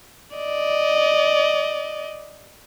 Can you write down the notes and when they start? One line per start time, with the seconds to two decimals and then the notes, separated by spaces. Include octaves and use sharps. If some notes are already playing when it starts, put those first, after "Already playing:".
0.36 D5 D#5